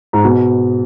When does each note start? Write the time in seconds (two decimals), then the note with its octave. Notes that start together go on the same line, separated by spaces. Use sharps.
0.13 G#2
0.24 B2